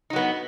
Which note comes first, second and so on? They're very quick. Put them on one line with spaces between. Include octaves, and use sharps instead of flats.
D#4 F#3 B3